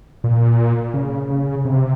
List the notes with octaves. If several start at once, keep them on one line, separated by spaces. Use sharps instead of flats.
A#2
C#3
C#3
C3